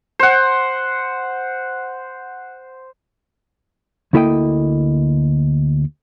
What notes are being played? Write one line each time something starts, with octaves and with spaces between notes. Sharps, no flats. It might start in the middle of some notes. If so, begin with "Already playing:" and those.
C5 F#5
D2 A#3 E4 A4 D#5 G5